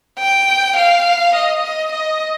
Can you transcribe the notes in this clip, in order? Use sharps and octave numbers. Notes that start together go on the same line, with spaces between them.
G5
F5
D#5
D#5
D#5